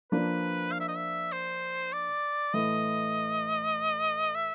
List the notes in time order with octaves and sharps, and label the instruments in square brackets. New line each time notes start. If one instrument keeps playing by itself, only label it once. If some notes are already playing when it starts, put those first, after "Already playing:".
[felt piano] F3 A#3 D4 [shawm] B4
[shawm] F5
E5
D#5
E5
C5
D5
[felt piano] A2 E3 A3 [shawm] D#5
[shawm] E5